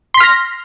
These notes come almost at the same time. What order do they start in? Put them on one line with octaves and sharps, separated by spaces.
C6 B6 F6 A#6